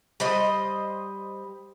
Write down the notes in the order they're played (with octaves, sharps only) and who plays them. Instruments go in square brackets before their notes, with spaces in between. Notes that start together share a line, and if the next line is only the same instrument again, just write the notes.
[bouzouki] G3 C5 D#5